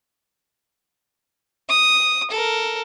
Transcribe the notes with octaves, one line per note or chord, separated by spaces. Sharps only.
D#6
A4 A#4